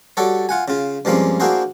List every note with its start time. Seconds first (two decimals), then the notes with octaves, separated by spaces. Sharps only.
0.17 G3 F#4 A4 C#5 D5
0.49 F4 F#5 G#5
0.68 C#3 F4
1.05 G2 F3 G#3 A#3 C4 C#4
1.40 A#3 D4 E4 F#4 G#4 C5